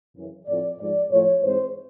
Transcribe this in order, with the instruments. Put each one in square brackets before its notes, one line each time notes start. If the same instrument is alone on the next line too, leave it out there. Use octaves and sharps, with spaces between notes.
[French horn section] F#2 C#3 E3
A2 F3 A3 C4 D5
G#2 F3 G#3 D5
A2 F3 A3 C#5
G#2 E3 G#3 C4 C5